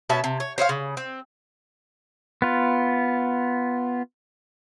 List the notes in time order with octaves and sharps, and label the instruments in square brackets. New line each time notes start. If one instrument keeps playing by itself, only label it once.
[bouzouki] B2 C#4 E5 A5
C3
C#5
C5 C#5 D#5 F5
C#3
C4
[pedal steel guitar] B3 F4